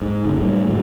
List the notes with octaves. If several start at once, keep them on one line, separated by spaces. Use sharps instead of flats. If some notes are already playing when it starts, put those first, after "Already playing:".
G#2
F#1 C#3
A2 G3
A2 F#3 G#3